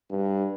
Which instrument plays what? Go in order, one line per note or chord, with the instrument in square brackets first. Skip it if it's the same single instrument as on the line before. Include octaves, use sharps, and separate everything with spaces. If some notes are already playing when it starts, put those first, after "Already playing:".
[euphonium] G2